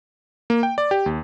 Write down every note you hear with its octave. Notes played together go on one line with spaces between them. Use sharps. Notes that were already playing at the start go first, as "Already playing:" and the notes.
A#3
G5
D5
G4
D#2